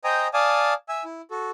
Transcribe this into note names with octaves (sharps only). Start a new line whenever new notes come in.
C5 D#5 G5 G#5 A#5 D#6
D5 F5 G#5 A5 D#6
E5 G#5 E6
E4
F#4 A4